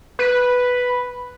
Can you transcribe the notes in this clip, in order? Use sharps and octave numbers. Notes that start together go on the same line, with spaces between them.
B4